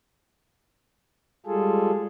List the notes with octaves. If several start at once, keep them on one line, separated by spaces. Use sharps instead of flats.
G3 G#3 F4 G#4 A4